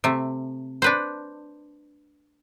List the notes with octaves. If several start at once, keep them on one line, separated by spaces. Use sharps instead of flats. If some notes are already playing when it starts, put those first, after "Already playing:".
C3 A3
D4 B4 C5